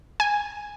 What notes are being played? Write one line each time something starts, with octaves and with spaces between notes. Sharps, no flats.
G#5